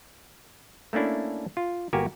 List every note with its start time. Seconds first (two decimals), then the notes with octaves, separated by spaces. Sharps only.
0.93 A3 A#3 C#4 D4 E4
1.57 F4
1.93 G1 A#3 F#4 G4 A#4 G#5